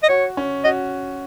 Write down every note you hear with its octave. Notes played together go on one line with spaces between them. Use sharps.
D#5
F#4 C#5
C#4
F#4 D#5